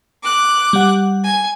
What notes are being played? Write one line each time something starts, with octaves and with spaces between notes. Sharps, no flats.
D6 F#6
G3 F#5
G#5